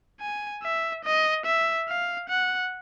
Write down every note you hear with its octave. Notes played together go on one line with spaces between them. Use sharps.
G#5
E5
D#5
E5
F5
F#5